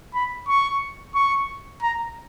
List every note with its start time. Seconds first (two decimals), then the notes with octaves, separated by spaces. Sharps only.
0.15 B5
0.48 C#6
1.15 C#6
1.82 A#5